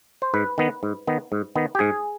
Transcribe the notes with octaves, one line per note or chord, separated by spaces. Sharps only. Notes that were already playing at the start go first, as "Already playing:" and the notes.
C5
G#2 B4
D#3 B3
G#2
D#3 B3
G#2
D#3 B3
G4
G#2 G#4